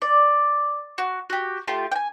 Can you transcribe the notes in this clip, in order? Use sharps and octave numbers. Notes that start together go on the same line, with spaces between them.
D5
F#4
F#4 G4
A3 F4 G4 C6
G5 G#5